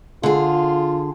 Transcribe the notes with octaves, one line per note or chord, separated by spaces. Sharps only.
D3 F4 G#4